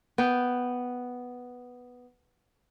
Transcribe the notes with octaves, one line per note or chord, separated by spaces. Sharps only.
B3 G5